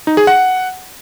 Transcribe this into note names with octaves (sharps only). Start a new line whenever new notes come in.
D#4
G#4
F#5